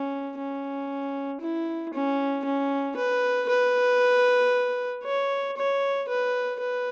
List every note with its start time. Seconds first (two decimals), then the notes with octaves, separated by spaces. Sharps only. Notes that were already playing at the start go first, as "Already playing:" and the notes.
Already playing: C#4
0.38 C#4
1.40 E4
1.93 C#4
2.44 C#4
2.96 B4
3.49 B4
5.04 C#5
5.57 C#5
6.08 B4
6.60 B4